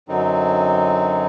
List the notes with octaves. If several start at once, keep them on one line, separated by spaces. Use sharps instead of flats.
F#2 D3 F#3 C4 D#4